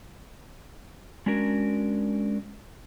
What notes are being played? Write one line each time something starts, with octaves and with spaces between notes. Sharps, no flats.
G#3 C#4 D4 F#4 A#4